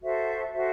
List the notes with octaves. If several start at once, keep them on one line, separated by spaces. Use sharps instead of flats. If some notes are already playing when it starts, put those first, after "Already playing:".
F#4 A4 C5 E5
F#4 A4 C5 E5